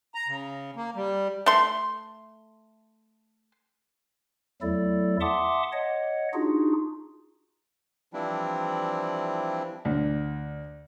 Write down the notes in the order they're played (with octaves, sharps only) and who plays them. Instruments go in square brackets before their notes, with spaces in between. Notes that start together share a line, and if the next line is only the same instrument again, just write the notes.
[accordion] A#5
C#3
A#3
G3
[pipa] A3 C6
[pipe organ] E2 F#3 A3 E4 A4 D5
E5 F#5 A5 C6 D6 D#6
C#5 D#5 F#5
D4 D#4 F4 F#4 G#4
[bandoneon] E3 F3 G3 C4 D4 E4
[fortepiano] D2